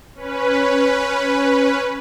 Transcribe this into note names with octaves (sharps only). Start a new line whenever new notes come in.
C#4 B4